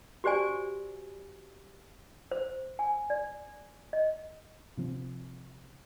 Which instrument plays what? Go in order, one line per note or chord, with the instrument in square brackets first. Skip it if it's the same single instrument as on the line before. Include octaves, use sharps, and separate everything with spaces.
[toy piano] F#4 G4 C5 D5 G#5
C5
G#5
D5
D#5
[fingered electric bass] C3 F3 C4